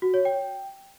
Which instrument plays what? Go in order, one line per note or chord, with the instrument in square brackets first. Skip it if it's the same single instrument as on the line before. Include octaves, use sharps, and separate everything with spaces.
[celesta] F#4
C#5
G5